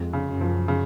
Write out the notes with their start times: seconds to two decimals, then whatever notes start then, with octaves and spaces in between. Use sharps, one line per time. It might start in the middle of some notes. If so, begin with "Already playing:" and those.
Already playing: F2 G#3
0.13 C#3
0.27 F#2
0.41 F3
0.68 C#3